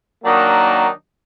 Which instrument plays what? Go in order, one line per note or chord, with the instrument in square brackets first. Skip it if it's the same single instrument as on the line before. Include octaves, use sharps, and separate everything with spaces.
[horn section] D#3 F#3 A#3 D4 D#4 F#4